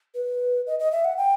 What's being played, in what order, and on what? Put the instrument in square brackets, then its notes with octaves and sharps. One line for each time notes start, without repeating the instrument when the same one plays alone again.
[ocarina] B4
D#5
D#5
E5
F#5
G5